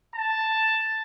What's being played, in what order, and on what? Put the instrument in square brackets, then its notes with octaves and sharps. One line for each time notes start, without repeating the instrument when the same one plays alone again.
[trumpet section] A5